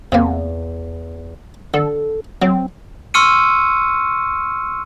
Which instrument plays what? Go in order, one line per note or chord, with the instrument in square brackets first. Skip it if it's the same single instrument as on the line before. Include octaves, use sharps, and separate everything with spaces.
[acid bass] E2 [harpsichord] C3 A#3
[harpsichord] D3 [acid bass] A4
[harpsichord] F#3 [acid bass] C4
[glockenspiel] C6 C#6 E6 F6 C#7 D#7